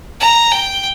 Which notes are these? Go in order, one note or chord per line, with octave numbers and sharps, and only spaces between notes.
A#5
G5